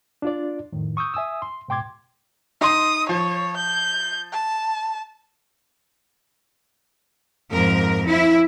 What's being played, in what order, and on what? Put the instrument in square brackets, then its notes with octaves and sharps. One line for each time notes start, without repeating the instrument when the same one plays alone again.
[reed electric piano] D4 F4 D5
F2 A2 D#3
C#6 D#6 E6 G6
E5 G#5 D#6 E6
C6
G#2 B2 G5 C6 D6 G#6
[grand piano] D#4 D#5 C6 [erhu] D#6
[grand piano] F3 [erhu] C#5
[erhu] G6
A5
[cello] F2 G#2 [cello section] A#4
[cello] F3 [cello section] E4